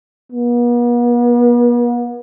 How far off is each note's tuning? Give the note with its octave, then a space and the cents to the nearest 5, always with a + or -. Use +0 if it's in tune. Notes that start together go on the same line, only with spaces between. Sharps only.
B3 -45